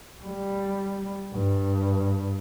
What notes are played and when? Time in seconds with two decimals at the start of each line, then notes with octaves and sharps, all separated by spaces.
0.23 G3
1.34 G2